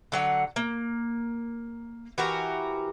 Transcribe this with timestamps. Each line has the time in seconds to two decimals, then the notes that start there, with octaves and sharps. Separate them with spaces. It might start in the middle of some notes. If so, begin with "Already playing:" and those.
0.12 D3 F#3 F#5
0.56 A#3
2.18 E3 F#4 G4 A#4